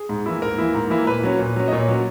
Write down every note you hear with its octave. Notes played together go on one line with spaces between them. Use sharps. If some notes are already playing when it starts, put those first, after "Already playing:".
Already playing: G#4
G#2
E3 A#3 E4
G#2 A#4
E3 A#3 E4
G#2
E3 A#3 E4
A#2 B4
F#3 C#4
A#2
F#3 C#4
D#5
A#2 C#5
F#3 C#4